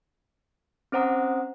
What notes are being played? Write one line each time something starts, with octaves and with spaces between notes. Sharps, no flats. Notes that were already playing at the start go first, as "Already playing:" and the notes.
C4 C#4 C5 F#5 A#5 D#6